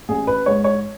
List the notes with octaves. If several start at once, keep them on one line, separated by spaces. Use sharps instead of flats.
A1 G#4
B4
G#2 G#3 C#5
C#5